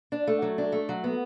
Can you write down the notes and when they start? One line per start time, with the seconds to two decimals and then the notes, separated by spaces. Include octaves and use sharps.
0.12 D4
0.27 A3
0.42 F#3
0.58 D4
0.72 A3
0.89 F#3
1.04 B3